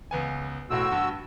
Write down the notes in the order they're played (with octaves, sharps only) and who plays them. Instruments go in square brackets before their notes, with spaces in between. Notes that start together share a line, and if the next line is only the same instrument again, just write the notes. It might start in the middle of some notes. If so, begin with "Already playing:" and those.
[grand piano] C#2 B3 G#5
[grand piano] E1 A2 [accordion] F#4 E6
[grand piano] G2